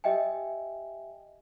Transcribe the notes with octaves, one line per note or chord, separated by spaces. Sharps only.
G4 D#5 E5 G5 G#5